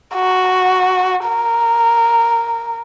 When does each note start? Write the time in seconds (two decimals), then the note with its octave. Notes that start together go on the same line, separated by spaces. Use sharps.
0.15 F#4
1.26 A#4